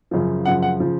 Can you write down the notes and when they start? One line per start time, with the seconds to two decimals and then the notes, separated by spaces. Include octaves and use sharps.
0.11 F#2 C#3 F3
0.45 F#2 C#3 F3 F#5
0.62 F#5
0.80 C#3 F3